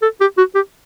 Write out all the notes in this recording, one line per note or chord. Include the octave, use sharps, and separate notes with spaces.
A4
G4
F#4
G4